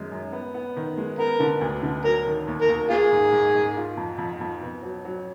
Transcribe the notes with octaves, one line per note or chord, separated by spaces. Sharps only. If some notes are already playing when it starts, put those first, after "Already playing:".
Already playing: F#2 D#3 G#3
F#2
B3
B3
D#3
G#3
B3 A#4
D3
D2
D3
F#3 A#4
D#3
D#2
A#4
D#2
A#3 F4 G#4
G#2
G#2
G#2
F4
F2
F2
F2
B2
F#3
F#3